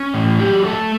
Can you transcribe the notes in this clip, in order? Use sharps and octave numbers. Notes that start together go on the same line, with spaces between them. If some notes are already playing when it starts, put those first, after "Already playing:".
Already playing: C#4
A2
F#3 G4
A3 A4